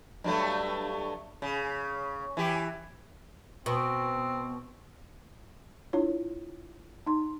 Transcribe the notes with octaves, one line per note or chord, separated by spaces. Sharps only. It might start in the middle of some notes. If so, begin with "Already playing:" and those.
G2 F#3 A3
C#3
E3 G4
B2 C4
D4 E4 F4 C#5
D#4 C6